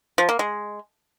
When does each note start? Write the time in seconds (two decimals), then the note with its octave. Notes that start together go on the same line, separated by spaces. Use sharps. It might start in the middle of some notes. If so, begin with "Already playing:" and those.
0.18 F3
0.29 A#3
0.39 G#3